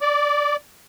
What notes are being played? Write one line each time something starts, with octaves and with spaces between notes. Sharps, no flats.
D5